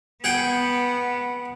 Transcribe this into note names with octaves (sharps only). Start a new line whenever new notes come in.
B3 G#4 F#5 G5